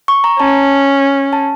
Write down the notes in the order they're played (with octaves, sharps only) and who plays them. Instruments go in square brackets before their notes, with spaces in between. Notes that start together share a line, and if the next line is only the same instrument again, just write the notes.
[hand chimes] C#6
A#5
[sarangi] C#4 [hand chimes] A5
[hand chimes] A5